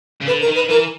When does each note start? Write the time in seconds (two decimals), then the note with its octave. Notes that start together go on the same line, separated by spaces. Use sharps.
0.22 C#3
0.26 D3 B4
0.41 A#4
0.48 D#3
0.55 B4
0.69 E3 A#4